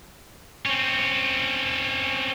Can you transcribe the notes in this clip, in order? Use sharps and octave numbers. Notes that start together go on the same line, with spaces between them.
C4 C#4